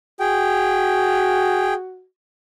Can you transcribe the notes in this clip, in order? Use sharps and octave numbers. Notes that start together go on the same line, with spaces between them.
F#4 G#4 G5